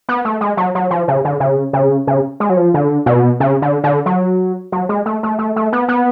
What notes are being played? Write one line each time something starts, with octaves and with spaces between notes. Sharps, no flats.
B3
A3
G#3
F#3
F#3
F3
C#3
D3
C#3
C#3
C#3
G#3
F#3
F3
D3
B2
C#3
D3
D3
F#3
F#3
G#3
A3
A3
A3
A3
B3
B3